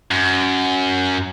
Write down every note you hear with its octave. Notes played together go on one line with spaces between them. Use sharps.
F#2